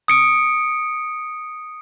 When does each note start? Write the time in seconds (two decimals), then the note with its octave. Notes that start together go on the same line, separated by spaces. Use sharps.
0.08 D#6 C#7 D7